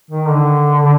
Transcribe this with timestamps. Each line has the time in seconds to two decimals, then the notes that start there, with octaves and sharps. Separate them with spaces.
0.11 D#3
0.29 D3
0.83 D3